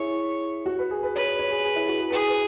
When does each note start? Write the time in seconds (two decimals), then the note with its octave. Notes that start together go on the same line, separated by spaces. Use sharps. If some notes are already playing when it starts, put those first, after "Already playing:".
Already playing: E4 G#4 C#5
0.66 F#4
0.79 B4
0.91 G#4
1.03 B4
1.16 B4 C#5
1.39 C#5
1.51 G#4
1.64 G#4
1.76 E4
1.88 F#4
2.01 G#4
2.12 G#4 B4
2.28 B4